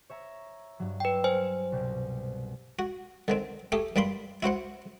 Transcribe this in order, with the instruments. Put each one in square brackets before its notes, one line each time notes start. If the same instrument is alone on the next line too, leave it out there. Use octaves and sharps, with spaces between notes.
[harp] C#5 E5 A#5
G2 F#3
[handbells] B4 G5
C5 G#5
[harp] C2 B2 G5
[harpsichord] F#4
D3 D#3 C4
A3 G4 G#4
G2 G3 A#3 B5 C6
E4 F#4 C5 F#5